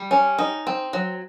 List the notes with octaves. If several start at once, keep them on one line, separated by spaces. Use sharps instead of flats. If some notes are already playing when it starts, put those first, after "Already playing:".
Already playing: G3
C#4
D#4
C4
F#3